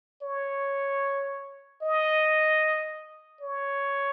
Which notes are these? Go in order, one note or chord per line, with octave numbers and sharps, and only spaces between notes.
C#5
D#5
C#5